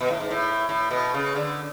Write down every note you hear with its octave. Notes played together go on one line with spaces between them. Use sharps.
B2
A2
G#2
A2
A2
B2
C#3
D3